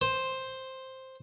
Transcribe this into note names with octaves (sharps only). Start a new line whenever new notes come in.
C5